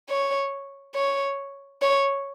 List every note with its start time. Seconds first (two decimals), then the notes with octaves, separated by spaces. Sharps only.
0.09 C#5
0.95 C#5
1.82 C#5